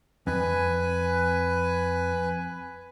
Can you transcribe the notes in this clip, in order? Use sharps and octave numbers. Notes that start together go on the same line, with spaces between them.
F2 B4 G#5